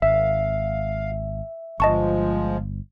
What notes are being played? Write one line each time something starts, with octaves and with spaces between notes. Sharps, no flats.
G#1 E5 F5
G1 F3 G#3 D#5 A5 C#6